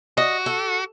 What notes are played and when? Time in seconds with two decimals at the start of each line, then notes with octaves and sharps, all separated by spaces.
0.17 F#4 D#5
0.46 A4